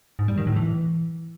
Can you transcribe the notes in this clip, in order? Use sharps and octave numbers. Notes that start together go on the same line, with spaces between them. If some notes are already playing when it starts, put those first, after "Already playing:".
G#2
G3
D#3
A2
E3